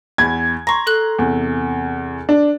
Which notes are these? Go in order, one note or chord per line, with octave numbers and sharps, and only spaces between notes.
E2 G#5 B5 G#6
A#5 C6 C#6 A#6
A4 F#6 F#7
E2 C3
D4